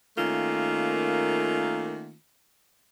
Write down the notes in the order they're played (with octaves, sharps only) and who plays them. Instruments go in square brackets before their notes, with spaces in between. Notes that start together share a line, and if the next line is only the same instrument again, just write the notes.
[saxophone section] D#3 A3 A#3 C#4 F4